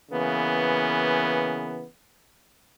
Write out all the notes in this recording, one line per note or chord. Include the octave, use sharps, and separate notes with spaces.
C#3 E3 A#3 B3